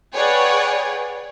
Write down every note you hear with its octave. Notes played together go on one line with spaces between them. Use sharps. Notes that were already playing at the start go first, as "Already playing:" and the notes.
G#4 B4 C#5 D5 F#5 G5